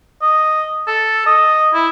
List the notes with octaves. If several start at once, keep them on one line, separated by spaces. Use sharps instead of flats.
D#5
A4
D#5
E4